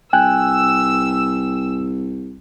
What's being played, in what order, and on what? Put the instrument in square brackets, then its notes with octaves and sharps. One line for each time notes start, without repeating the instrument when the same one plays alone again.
[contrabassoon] C2 [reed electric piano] G5 G#5 F#6 [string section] E6